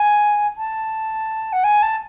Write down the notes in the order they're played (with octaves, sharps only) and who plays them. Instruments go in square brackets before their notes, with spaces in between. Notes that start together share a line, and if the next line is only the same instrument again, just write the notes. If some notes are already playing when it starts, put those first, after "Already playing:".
Already playing: [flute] G#5
A5
F#5
G#5
A5